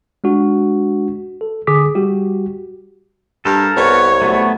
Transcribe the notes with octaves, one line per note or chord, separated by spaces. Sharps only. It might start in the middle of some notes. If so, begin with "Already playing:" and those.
G#3 D4 F#4
A4
D3 G#4 D6 D#6 B6
G3 F#4 G4
G2 A4 A#4
C2 B3 C#5
F#3 A3 B3